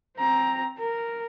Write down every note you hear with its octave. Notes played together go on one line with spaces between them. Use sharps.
C4 A#5
A#4